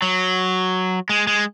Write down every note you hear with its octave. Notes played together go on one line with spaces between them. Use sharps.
F#3
G#3
G#3